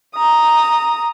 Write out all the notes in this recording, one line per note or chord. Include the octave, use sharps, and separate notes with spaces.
A#5 D#6